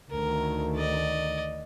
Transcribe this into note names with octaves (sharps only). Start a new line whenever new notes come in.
D2 D#3 A#4
D5 D#5